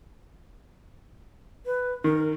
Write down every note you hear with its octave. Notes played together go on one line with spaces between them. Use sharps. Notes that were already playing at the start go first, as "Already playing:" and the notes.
B4
D#3 A#4